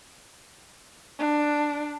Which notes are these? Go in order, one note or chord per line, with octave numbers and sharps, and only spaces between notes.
D4